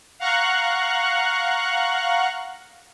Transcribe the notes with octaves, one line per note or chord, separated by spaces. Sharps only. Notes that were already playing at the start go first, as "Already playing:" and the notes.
F5 F#5 A#5 C#6 F#6